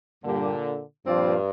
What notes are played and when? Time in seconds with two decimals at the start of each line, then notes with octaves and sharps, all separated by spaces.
0.24 G2 A#2 D3 G3 A#3 G4
1.06 G2 A#2 F3 C4 F4 D5